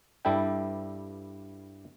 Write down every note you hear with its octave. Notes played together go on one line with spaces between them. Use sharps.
G2 G3 E4 A4 E5 G5